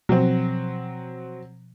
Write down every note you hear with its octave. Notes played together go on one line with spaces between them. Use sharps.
B2 F3 F#3 C4